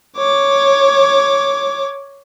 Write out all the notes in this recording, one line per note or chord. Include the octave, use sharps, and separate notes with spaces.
C#5 D6